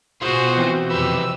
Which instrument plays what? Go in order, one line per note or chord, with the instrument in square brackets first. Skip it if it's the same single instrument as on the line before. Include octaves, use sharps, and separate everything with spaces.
[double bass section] B2 [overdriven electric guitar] F4 G#4 [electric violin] F#4 C5
[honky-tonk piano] E3 C4
[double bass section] F2 C3 [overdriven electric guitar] B3 G4 [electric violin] E6